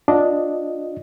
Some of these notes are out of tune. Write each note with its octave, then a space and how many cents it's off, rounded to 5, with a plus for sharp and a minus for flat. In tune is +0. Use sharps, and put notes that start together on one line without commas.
D4 +0 F4 +30 D#5 +5